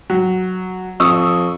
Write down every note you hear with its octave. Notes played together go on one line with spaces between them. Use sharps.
F#3
F2 C#6 D#6 E6